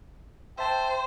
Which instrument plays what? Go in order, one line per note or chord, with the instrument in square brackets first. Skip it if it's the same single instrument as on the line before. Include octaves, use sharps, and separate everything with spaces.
[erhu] C5 [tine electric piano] E5 A5 [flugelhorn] G5